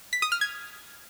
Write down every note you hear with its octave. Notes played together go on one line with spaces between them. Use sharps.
B6
D#6
F6
G#6